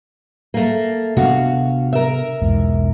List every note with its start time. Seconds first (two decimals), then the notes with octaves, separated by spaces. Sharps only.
0.54 A3 A#3
1.17 D2 C3 B3 F#4 F5
1.93 A#4 E5
2.42 B1 E2 G#2